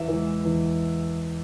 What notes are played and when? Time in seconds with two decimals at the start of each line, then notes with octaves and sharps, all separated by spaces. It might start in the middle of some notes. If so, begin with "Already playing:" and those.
Already playing: E2 E5
0.08 E3 G#3
0.45 E2